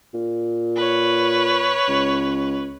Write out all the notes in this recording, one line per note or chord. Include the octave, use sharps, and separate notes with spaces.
A#2
B4 C#5
C#2